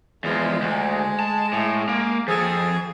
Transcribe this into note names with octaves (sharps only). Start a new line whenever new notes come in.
E2 F3 G#3
D2
A5
A2
A#3
F3 G#4 A4